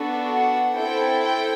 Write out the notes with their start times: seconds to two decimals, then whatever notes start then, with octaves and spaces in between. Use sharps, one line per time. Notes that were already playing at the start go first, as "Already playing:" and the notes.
Already playing: B3 D4 F#4 A4
0.29 F#5
0.77 C4 E4 A4 G5
1.25 G5